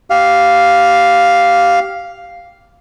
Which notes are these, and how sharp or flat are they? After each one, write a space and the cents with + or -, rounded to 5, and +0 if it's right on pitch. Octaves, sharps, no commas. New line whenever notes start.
G4 -15 F5 +0